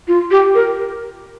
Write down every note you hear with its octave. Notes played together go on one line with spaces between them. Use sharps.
F4
G4
A#4